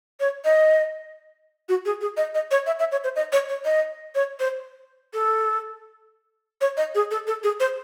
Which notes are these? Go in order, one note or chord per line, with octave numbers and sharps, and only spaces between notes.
C#5
D#5
F#4
G#4
G#4
D#5
D#5
C#5
E5
E5
C#5
C5
D#5
C#5
C#5
D#5
C#5
C5
A4
C#5
D#5
G#4
A4
A4
G#4
C5